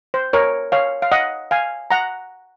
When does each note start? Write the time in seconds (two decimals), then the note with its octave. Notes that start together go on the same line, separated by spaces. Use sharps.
0.14 C5
0.33 A#4 C#5
0.72 C#5 F5
1.02 F5
1.12 D#5 F#5
1.51 F5 G#5
1.91 F#5 A#5